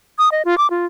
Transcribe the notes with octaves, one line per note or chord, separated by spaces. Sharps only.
D#6
D#5
F4
D6
F4